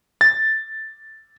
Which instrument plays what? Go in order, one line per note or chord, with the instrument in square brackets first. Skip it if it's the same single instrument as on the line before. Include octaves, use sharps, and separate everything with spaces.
[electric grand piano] A6